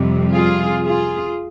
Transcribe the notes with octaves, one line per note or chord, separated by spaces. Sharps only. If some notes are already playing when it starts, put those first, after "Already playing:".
Already playing: F2 C3 G3
F4 G#4
F4 G#4